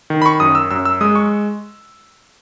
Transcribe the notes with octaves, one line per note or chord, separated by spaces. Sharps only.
D#3
B5
C#6
F#2 D#6
E6
F#2 E6
E6
G#3 D#6
C#6